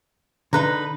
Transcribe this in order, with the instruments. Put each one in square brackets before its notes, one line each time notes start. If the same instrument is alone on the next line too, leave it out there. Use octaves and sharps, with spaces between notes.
[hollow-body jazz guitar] D3 [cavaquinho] D#4 B4 A#5